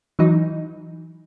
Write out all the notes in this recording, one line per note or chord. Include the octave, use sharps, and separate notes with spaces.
E3 F#3 D#4